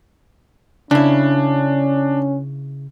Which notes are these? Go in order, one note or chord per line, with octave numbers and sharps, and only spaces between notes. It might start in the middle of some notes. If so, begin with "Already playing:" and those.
C#3 C#4 D4 E4